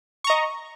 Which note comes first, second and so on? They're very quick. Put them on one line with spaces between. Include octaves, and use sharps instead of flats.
C#6 A#5 D#5